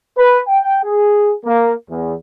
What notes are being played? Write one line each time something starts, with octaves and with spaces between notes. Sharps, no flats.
B4
G5
G#4
A#3
E2